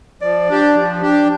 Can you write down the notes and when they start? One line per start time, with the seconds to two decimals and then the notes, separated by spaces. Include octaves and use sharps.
0.22 F3 D5
0.49 D4 G4
0.75 F3
1.01 D4 G4